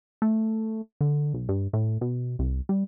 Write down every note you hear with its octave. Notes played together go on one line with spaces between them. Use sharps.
A3
D3
B1
G2
A2
B2
C2
G3